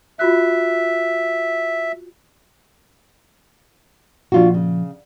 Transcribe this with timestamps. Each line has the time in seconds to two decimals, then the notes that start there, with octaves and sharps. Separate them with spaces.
0.19 F4 F#4 E5 F#6
4.32 A#2 F3 D4 F4 F#4
4.54 C#3